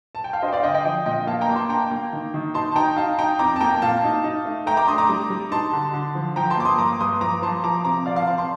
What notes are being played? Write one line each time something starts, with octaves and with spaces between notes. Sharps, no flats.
A5
G5
F5
D4 C5 D#5
G5
D5 F5
D3 D#5 G5
D#5 G5
F3 D#5 G5
A#2 D#5 G5
A#3 F5 A5
G5 A#5
A#3 D6
A5 C6
D4 G5 A#5
A#3
D#3
D#3
D#4 A5 C6
A5
D#4 G5 A#5
D#4 F5 A5
D#4 G5 A#5
F2 A#5 D6
A5
A#3 G5 A#5
A#2 F5 A5
D#4
D#4
A3
A3 G5 A#5
A#5 D6
D4 C6 D#6
A#5 D6
G3
G3
D#4 A5 C6
D3
D3
F3
F3 G5 A#5
A5 C6
A#3 D6
C6 D#6
G2 A#5 D6
G2 C6 D#6
F3 A#5 D6
F3 A5 C6
F3 A#5 D6
C3 A#5 D6
F3 D5 F5
F5 A5
C4 A5 C6
A5 C6